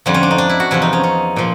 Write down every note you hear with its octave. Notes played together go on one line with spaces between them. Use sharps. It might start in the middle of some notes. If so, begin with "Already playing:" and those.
F2 D3 F3 G3
C#4
D4
D#4
D4
E4
F#4
E2 C3 F3 E4
D#4
C#4
C#4
A#2 F3